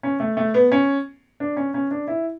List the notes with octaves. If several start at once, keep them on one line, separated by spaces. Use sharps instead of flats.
C#4
A3
A3
B3
C#4
D4
C#4
C#4
D4
E4